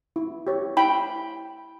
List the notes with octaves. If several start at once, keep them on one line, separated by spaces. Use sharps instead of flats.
E4
G4 C#5
E4 G5 B5